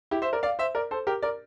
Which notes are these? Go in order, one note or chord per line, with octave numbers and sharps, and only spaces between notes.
E4 G4
C5 E5
A#4 D5
D5 F5
C5 E5
A#4 D5
A4 C5
G4 A#4
A#4 D5